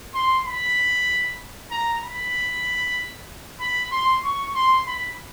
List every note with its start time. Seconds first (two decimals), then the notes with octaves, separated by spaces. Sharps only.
0.14 C6
0.45 B5
1.71 A#5
2.03 B5
3.61 B5
3.92 C6
4.23 C#6
4.55 C6
4.87 B5